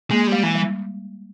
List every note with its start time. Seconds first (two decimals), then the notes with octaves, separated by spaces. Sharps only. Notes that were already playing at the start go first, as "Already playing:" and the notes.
0.11 G#3 A#3
0.27 G3
0.32 G#3
0.43 E3
0.55 G3